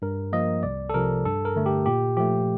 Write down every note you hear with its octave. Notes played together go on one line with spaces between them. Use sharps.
G2 A#4
F3 A#3 D#5
C2 D5
A4
C3 F3 A#4
G2 A4
A#4
D3 A3
G4
A#2 G4
F3 A3 G4